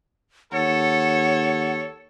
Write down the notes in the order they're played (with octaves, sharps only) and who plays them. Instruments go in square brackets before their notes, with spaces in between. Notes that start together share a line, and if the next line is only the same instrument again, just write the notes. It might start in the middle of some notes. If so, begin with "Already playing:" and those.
[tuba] D#2 [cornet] A4 [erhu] C#5 [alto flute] F#5